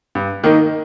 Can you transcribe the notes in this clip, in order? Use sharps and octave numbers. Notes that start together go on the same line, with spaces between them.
G2
D#3 A#3 D#4